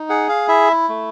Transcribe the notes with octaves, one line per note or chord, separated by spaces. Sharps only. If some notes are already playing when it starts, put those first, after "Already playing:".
Already playing: D#4
G#4 F#5
F5
E4 E5
A3